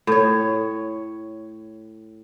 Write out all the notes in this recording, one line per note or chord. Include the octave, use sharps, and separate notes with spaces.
A2 C#5